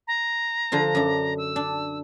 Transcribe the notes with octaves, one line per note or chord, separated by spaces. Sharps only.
A#5
D3 F3 F4
F#2 D4
E6
D4